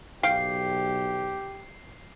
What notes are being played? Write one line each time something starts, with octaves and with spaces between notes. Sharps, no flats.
B1 G4 F5 G5 C7